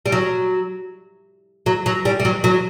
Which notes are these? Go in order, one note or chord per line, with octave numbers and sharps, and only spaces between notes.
G3
F#3
F#3
F#3
G3
G3
F#3
F#3